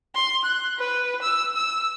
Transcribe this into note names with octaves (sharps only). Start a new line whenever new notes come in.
C6
F#6
B4
E6
E6